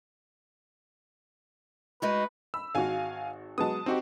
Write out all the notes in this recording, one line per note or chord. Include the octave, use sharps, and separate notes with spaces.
G#3 D#4 F#4 B4
B5 E6
G#1 F#4 F5 G#5
F#3 G#3 B3 A5 D#6
C4 D#4 F#4 G4